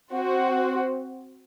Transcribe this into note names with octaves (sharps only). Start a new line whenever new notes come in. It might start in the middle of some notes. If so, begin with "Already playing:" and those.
C4 F#4 C5